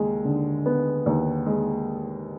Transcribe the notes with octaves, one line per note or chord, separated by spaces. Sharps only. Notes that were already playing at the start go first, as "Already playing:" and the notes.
Already playing: D#2 G#3
D3
B3
D#2
G#3